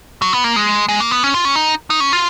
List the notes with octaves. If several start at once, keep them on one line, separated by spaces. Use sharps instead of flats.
F#3
B3
A#3
G#3
G#3
A#3
B3
C#4
F4
C#4
D#4
D#4
C#4
F4